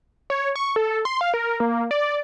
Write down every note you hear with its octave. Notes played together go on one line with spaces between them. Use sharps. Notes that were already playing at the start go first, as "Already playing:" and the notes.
C#5
C#6
A4
C6
F5
A#4
A#3
D5